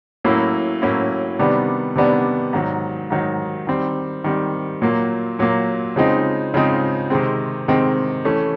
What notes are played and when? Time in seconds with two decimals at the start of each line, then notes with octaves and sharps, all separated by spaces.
0.25 A2 F#3 A#3 C#4 E4
0.82 A2 F#3 A#3 C#4 E4
1.39 C3 D#3 G3 B3 D4
1.95 C3 D#3 G3 B3 D4
2.53 G#2 D#3 F#3
3.10 G#2 D#3 F#3
3.67 D#3 G3 C4
4.24 D#3 G3 C4
4.82 A#2 F#3 A#3
5.39 A#2 F#3 A#3
5.96 C#3 F3 G#3 C4 D#4
6.54 C#3 F3 G#3 C4 D#4
7.10 C3 D#3 G#3 C4
7.68 C3 D#3 G#3 C4
8.25 E3 A3 C#4